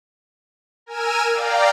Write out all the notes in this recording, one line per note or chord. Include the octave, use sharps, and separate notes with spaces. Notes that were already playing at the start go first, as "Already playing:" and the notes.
A#4 G#5 E6 F6 D#7
D5 F5 G5 A#5